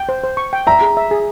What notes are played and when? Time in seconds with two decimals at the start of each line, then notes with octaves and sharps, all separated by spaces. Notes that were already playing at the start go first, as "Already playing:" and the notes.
Already playing: G5
0.09 C5
0.24 C5
0.37 C#6
0.53 G5
0.67 E5 A#5
0.81 G#4
0.97 E5
1.11 G#4